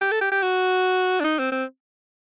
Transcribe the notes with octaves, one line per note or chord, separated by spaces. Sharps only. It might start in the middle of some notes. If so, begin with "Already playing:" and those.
G4
A4
G4
G4
F#4
D4
D#4
C4
C4